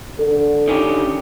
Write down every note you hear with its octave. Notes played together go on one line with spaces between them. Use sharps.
D3 A4
D#3 C#4 G4